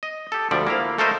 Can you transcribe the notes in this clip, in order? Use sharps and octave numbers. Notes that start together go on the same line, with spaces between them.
D#5
G4 A4
D2 F3 G3 D5
A#3 E4 F5
A3 A4 A#4 C5 D#5